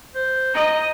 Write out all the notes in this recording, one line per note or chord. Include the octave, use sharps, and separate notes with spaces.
C5
D#5 A#5